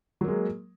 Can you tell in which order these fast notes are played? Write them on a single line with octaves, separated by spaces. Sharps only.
F#3 A#3 G#3